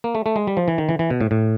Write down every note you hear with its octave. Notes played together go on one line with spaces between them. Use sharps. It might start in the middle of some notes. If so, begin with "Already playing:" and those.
A#3
A3
A3
G#3
G3
F3
E3
D#3
E3
E3
B2
A2
A2